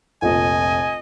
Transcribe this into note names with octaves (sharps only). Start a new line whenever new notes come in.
F1 A#1 D#5 G#5